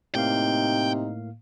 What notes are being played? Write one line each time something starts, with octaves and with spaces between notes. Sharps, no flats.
A2 C3 A#3 D#4 F5 G5